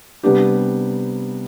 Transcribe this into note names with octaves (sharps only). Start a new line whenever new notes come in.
C3 G3 B3 D4 G4